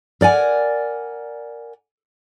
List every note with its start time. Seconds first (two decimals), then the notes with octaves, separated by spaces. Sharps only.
0.21 A#4 D5 F#5 G#5